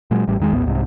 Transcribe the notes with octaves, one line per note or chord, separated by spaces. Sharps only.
A#2 F#3 G#3
A1 A2 G3
E2 D#3 G#3
A#1 D#2 A2 B3
C2 G#2 C3